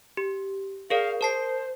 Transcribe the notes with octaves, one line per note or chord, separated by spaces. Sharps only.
G4
G#4 A#4 D5 F5
A#4 C5 A5 C7